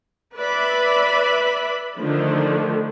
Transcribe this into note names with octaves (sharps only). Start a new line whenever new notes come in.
B4 D5 E5 B5
D3 D#3 F3 A3 D4